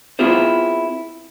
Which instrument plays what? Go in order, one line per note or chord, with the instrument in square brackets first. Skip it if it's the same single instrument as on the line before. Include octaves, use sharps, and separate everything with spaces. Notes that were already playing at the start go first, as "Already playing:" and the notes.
[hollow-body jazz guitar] B3 C4 E4 F4 G#4 C5